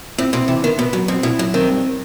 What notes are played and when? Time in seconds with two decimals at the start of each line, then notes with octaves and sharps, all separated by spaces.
0.18 A2 C4
0.33 B2 C4
0.48 C3 E3
0.63 D#3 B3
0.78 B2 B3
0.93 B2 F#3
1.08 B2 C4
1.23 B2 E4
1.38 F#2 B2
1.54 D#3 C4
1.69 G2